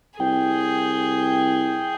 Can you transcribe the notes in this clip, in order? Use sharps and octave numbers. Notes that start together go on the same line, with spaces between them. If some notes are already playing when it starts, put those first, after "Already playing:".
C2 G#4 G5